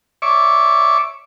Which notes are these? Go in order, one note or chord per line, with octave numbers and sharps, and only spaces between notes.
C#5 D5 E5 C#6 D6